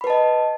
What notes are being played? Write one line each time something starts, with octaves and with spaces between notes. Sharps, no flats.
B4 D#5 A5 B5